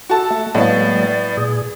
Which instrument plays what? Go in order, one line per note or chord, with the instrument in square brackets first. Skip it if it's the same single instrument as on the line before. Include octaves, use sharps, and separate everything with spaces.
[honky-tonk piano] F#4 A5 [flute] A4
[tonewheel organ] A3
[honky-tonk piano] A2 B3 [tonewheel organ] F#3 G#3 A#3 [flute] D5
[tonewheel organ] A#2 G#4